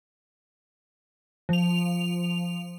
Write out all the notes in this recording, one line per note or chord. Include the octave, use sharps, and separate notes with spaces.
F3 F7